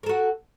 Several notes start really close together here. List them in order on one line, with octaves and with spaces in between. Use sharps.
A#4 A4 F#4